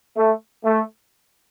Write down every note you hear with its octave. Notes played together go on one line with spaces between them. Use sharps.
A3
A3